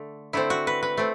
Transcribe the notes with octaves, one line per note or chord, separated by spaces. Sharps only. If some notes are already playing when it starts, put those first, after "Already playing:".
Already playing: D3 A3
D3 A3 C4 E4
F#4
B4
B4
A3 C4